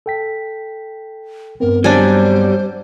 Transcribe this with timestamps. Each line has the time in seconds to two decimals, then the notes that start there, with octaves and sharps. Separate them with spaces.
0.06 A4 G5 B6
1.60 G2 B3 C4 A#4
1.84 F#3 G3 D4 C5 G#5